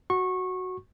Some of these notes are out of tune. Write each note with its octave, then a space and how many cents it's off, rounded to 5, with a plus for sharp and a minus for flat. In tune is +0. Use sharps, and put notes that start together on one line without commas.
F#4 +0 C#6 -20